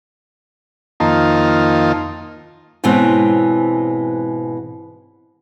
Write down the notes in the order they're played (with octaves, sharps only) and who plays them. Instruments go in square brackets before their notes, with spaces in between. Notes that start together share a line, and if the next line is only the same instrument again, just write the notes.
[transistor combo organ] F2 D#3 A#3 D#4 F4 A5
[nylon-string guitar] G#2 B2 E3 G#3 C4 C#4